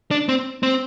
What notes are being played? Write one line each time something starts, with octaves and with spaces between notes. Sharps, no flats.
D4
C4
C4